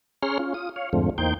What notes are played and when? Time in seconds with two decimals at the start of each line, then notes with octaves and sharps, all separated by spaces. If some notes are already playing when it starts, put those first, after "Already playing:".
0.23 C#4 G#4 C#5 A#5 C6 F6
0.39 C#4 F4
0.54 F4 D#6
0.76 C#5 F5
0.93 F2 G#2 D3 F3 A3 C4
1.18 E2 A#3 D#4 C5 G5 G6